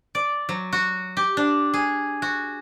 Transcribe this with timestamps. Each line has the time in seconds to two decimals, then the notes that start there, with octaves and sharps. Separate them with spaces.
0.15 D5
0.49 F#3
0.73 F#4
1.17 G4
1.37 D4
1.74 G#4
2.22 F#4